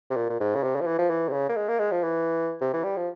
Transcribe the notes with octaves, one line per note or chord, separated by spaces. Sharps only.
C3
A#2
A#2
G#2
C#3
C3
C#3
F3
E3
F3
E3
C3
C#3
A#3
G#3
A#3
G#3
F3
E3
C3
E3
G3
F3